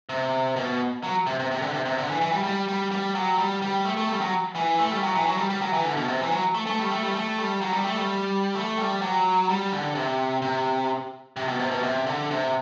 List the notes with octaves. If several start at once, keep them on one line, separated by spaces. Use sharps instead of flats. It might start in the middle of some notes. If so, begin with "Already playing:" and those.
C3
B2
F#3
C3
C3
C3
D3
C3
C3
D3
E3
E3
G3
G3
G3
G3
F#3
G3
G3
A3
A3
G3
F#3
E3
A3
G3
F#3
E3
F#3
G3
G3
F#3
E3
D3
B2
C3
E3
F#3
A3
A3
G3
A3
G3
A3
G3
F#3
G3
A3
G3
A3
G3
F#3
G3
D3
C3
C3
C3
B2
C3
B2
C3
D3
C3